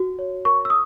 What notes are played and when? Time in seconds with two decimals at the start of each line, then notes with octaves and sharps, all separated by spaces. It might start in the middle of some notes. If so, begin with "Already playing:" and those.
Already playing: F#4
0.19 C#5
0.45 A#4 C#6
0.65 E6
0.70 D#6